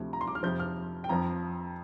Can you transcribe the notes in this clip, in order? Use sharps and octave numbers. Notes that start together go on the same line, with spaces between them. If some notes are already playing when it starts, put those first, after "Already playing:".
Already playing: D2 C3 F3
A#5
C6
D6
F6
F2 C3 F3 G6
F6
G5
F2 F3 A#5